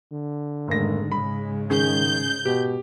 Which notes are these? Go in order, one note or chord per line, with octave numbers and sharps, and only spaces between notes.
D3
F1 G#2 D#3 G#3 A#3 A#6
G#2 C#3 G#3 B5
D#3 C#4 G#4 G6
B2 G4